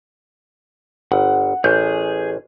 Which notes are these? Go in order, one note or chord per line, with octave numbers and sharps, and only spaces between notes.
G1 F#5
A1 G#4 G6